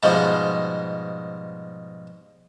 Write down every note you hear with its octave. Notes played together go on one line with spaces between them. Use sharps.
G#2 B2 F3 G3 G#3